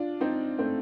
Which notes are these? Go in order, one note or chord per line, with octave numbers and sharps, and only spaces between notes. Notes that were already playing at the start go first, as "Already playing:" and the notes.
Already playing: D4 F4
C4 D#4
A3 C4